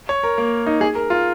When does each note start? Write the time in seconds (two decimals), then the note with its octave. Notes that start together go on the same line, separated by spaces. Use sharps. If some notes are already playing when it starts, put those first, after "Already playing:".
0.09 C#5
0.23 A#4
0.38 A#3
0.67 D#4
0.81 G#4
0.95 A#4
1.10 F4